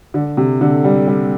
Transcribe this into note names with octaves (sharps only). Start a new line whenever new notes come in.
D3
C3
D3
G3
G3